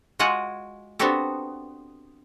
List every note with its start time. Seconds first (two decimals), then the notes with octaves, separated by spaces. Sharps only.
0.19 G#3 F4 F#4 F#5 G#5
0.99 B3 C4 D4 F#4 G4 A4